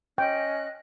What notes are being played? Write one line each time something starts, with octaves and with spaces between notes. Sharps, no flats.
C#4 D#5 G5 F#6